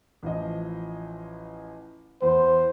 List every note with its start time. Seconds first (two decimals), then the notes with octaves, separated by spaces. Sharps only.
0.23 A1 F3 D#5
2.22 E2 C5